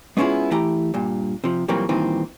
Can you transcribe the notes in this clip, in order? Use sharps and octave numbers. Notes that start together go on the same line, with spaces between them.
G#3 B3 C#4 E4 F4 G#4
E3 A3 E4 G4 A#5
G2 A#2
C3 F3
A#2 E3 F#3 G3 A#3 C4
G2 A#2 D#3 E3 C4